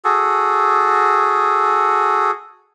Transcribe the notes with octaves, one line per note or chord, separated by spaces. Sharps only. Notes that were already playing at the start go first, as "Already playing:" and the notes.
F#4 G#4 A4